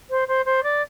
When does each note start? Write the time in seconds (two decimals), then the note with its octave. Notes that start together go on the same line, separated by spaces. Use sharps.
0.10 C5
0.28 C5
0.45 C5
0.63 D5